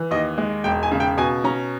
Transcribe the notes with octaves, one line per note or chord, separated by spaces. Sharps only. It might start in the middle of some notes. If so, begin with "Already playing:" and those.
Already playing: E3
D#2 D#5
G#3
E1 G5
G#5
C#3
G5
B2 G#5
C#4 A#5